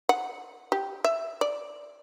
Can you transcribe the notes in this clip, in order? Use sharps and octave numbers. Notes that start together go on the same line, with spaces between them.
F#5
G4
E5
D5